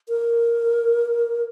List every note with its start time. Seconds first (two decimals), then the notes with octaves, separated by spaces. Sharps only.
0.09 A#4